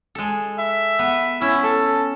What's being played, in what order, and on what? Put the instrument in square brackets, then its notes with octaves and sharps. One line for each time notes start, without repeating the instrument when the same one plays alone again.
[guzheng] G#3 A4
[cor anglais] E5
[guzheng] B3
[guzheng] C#4 [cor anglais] E4
[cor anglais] A4